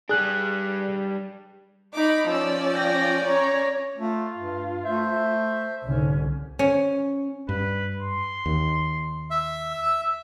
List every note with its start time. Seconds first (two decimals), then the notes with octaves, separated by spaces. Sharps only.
0.09 G3 D4 G#4 F#6
1.95 D#4 B5 D6
2.29 F3 C#4 D5 E6
2.74 G5 A#6
3.26 C#5 A#5
3.98 A3 F4
4.37 G2
4.85 A3 C5 E5
5.85 C2 G#2 D3 C#4
6.59 C#4
7.49 G2 B4
8.01 C6
8.46 D#2
9.30 E5
9.72 E6